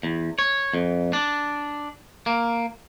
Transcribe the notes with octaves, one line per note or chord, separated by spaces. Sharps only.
E2
C#5
F2
D4
A#3